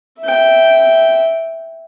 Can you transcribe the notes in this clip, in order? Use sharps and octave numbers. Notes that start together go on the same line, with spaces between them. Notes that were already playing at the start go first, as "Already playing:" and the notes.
E5 G5